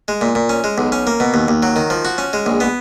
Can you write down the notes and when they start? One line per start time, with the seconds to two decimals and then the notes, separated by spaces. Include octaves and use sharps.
0.08 G#3
0.21 A#2
0.35 A#2
0.49 C#4
0.64 G#3
0.78 B1
0.92 C#4
1.07 A#3
1.20 B2
1.34 D#2
1.48 D#2
1.63 F#3
1.76 D#3
1.90 F3
2.05 F#4
2.18 C#4
2.33 G#3
2.46 A#1
2.60 B3